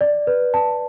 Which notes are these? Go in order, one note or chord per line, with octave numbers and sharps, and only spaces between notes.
D5
B4
A5